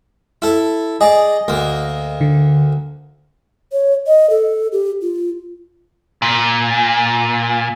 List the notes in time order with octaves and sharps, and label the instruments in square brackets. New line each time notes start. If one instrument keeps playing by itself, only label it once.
[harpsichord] E4 A4
[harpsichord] G#4 D5 [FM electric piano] D#5
[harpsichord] D2 A#3
[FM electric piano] D3
[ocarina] C#5
D#5
A4
G4
F4
[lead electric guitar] A#2